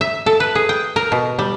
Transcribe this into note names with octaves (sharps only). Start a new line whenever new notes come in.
E5
A4
B4
G#4
G5
A#4
B2
G3